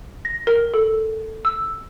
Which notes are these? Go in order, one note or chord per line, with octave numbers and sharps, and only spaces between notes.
A#6
A#4
A4
E6